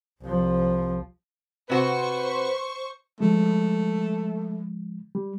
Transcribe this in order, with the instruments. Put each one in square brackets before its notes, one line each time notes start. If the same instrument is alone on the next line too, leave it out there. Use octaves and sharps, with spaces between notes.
[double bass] C2 F3
[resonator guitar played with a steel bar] C3 F#4 [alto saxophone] B4 [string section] C5 C#6
[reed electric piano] F3 G#3 [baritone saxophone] A3
[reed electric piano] G3